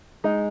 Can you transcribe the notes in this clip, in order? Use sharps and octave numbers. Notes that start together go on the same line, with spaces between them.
G#3 D#4